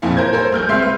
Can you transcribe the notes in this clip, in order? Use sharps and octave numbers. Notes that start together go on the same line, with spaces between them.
F#1 F2 A#2 E4 F5
A#4 C5 G6 G#6
A4 A#4 C5
A#1 F6 G6
C#2 C4 E5 C6 C7
B4